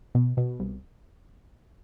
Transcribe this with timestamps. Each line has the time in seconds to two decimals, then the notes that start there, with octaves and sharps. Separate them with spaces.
0.15 B2
0.37 B2
0.60 C2